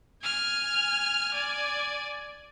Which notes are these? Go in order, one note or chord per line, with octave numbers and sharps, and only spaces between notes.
G#5 F6
D5 G#5